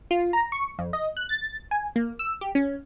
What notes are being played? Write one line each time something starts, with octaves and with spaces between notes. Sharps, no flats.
F4
A#5
C#6
F2
D#5
F#6
A6
G#5
A#3
E6
G4
C#4